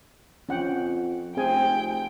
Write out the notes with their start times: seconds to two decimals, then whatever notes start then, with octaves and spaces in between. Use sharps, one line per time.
0.49 F2 C#4 F#5 G5
1.37 F1 C4 G#4 G5 G#5